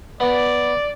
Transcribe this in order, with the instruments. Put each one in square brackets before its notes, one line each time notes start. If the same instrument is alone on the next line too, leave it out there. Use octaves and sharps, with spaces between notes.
[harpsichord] B3 [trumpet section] D5